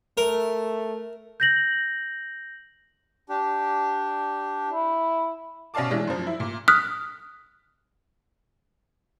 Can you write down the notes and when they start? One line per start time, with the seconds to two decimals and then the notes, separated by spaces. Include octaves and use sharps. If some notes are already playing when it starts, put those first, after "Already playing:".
0.17 A3 A#4
1.40 G6 A#6 F#7
3.29 D4 G4
4.69 E4
5.74 B2 C#4 D5 F5 A5 D6
5.91 E3 G#3 D4
6.07 F#2 F3
6.27 E4
6.40 A#2
6.68 D#6 F6 F#6 B6